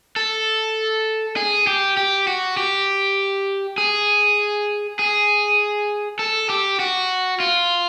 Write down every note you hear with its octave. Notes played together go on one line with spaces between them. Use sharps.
A4
G#4
G4
G4
F#4
G4
G#4
G#4
A4
G4
F#4
F4